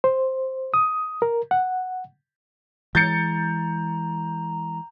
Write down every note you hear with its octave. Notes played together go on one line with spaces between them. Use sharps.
C5
D#6
A#4
F#5
E3 G#3 A#5 G6 A6 C#7